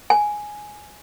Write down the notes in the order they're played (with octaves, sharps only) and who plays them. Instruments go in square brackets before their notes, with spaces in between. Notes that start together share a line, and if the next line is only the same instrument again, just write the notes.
[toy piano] G#5